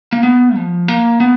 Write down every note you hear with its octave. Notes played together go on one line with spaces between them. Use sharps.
A#3
B3
F3
A#3
B3